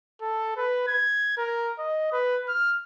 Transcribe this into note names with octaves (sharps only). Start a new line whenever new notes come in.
A4
B4
G#6
A#4
D#5
B4
F6